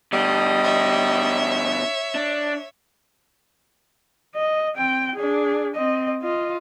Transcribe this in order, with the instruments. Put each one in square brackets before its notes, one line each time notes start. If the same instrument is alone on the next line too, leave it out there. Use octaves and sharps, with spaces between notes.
[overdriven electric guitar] B2 D3 [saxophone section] G3 D#5
[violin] C#5 E5
[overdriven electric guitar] D4
[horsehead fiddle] D#5
C4 G5
D4 G#4
C4 D#5
F4 D#5